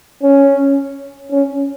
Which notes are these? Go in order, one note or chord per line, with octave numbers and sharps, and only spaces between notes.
C#4
C#4